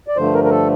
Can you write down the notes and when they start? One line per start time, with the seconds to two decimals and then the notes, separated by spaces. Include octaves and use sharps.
0.08 D5
0.16 G2 D3 F3 A3 C5
0.34 A#4
0.44 A#4
0.50 A4